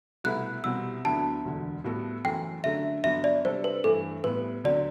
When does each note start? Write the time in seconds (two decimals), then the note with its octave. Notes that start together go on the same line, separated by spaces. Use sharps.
0.24 C2 B2 A3 E4 B4 F#6
0.64 C2 B2 G3 C4 E4 E6
1.05 D2 D3 F#3 B3 E4 A5
1.45 E1 D2 D3
1.84 A2 G3 B3 F#4 A4
2.24 F#1 F#2 E3 A3 G5
2.64 F#2 D3 A3 D4 E5
3.04 G1 G2 D3 F#3 B3 E5
3.24 D5
3.45 C3 G3 D4 A4 C5
3.64 B4
3.84 G2 E3 A3 E4 A4
4.24 A2 G3 B3 B4
4.64 D2 D3 F#3 C4 D5